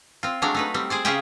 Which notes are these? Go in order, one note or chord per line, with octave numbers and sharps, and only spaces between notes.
C4 F4
F#3 G#3 A3 D4 F5
A3 D#4 B4
G3 C4
G#4 C5 D5
C#3 F4 G4 G#4 E5 G5